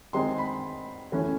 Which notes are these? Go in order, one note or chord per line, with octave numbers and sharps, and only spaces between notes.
D#3 G#3 C4 D#4 C6
B5
E3 A3 C#4